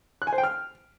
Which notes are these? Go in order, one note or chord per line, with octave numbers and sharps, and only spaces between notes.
F#6
G#5
C5
G5
F6